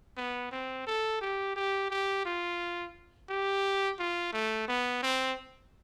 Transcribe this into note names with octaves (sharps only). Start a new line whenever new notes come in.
B3
C4
A4
G4
G4
G4
F4
G4
F4
A3
B3
C4